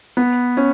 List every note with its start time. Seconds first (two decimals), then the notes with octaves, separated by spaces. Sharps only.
0.17 B3
0.57 C#4